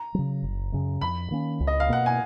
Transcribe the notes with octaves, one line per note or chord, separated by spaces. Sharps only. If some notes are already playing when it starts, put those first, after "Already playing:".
Already playing: A#5
C#3 F#3
F#1
F#2 C#3
F2 B5
D#3 A#3 C#4
C#2
D#5
F5
B2 A#3 F#5
G#5